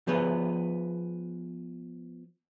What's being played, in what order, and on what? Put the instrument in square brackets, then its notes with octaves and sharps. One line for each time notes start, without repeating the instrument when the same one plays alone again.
[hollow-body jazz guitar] F3 B3 G#4 B4